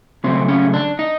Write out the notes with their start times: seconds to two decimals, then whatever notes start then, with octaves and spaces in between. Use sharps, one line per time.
0.24 C#3 F#3 A3 C4
0.48 C#4
0.74 D4
0.99 D#4